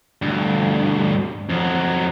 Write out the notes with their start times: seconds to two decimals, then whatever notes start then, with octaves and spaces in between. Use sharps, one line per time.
0.22 D2 G2
1.50 F2 F#3